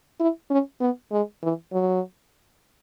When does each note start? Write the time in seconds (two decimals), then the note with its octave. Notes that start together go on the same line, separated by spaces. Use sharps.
0.20 E4
0.50 C#4
0.80 B3
1.12 G#3
1.43 E3
1.73 F#3